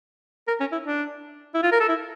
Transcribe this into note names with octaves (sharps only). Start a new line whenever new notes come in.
A#4
C#4
E4
D4
E4
F4
A#4
A4
E4